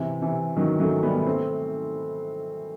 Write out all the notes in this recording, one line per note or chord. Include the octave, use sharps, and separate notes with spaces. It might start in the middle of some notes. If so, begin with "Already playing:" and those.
Already playing: C3 E3
C3 E3
D#3 F#3
F#3 A3
G3 B3
A3 C4